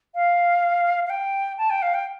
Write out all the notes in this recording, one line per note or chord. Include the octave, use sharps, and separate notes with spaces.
F5
F5
G5
A5
G5
F5
G5